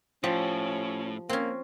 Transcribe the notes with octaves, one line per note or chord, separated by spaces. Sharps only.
A2 F3 C#4 G4
A#3 C4 C#4